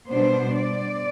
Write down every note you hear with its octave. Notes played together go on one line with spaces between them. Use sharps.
B2 G3 B3 D4 C5
D5